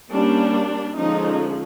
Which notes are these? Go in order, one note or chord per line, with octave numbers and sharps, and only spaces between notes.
G3 A#3 C#4 D4
D3 F3 G#3 C#4 D#4